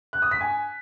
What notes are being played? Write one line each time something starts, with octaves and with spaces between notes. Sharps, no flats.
F#6
D#6
B6
G#5